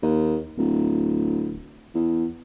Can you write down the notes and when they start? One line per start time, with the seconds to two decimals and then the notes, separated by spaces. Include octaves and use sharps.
0.02 D#2
0.58 D1
1.94 E2